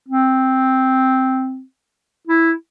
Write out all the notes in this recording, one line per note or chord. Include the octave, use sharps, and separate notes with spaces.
C4
E4